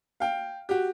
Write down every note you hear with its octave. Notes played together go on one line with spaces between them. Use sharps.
F5 G5
F#4 G4